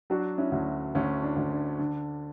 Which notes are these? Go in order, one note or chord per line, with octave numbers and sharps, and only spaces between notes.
F#3 D4 F#4
C#4 E4
D2
D2 C#4
D4
D2
D4
D3